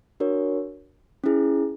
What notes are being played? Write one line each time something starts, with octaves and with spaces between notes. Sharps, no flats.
D4 F#4 A#4 C#5
C#4 E4 G#4